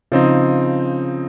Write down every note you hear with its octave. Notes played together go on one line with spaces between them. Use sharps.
C#3 F3 C4 D#4